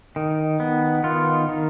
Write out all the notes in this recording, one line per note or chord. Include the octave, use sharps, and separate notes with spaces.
D#3
B3
D#3 F4
D#3